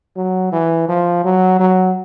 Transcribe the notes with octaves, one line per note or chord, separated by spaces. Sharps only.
F#3
E3
F3
F#3
F#3